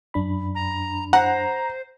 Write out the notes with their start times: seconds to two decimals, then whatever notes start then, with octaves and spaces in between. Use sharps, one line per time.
0.14 F#2 D4 B5
0.55 A#5
1.13 C5 F#5 A#5